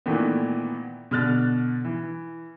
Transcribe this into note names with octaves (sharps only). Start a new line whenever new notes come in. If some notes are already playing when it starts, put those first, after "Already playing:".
A#2 D#3 E3 A3 B3
B2 D3 F6 F#6 A6
E3